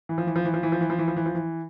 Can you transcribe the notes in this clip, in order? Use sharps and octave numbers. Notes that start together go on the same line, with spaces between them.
E3
F3
E3
F3
E3
F3
E3
F3
E3
F3
E3
F3
E3
F3
E3